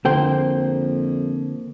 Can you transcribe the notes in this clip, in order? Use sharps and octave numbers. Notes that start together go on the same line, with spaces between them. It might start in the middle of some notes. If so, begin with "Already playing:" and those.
F2 D3 A#3 C5 G5